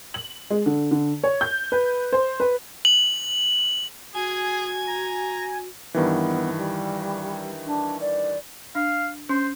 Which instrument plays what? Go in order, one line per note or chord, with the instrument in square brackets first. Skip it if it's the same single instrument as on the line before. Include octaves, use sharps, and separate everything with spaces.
[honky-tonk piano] F#7
G#3
D3
D3
C#5
G6
B4
C5
B4
[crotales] F#7
[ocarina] F#4 [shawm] G#4 [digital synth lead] G#5 [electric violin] G#6
[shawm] A#5
[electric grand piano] G2 D#3 E3 [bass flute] B3
[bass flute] G3
D4
D5
[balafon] D4 [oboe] F5
[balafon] C#4 [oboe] C5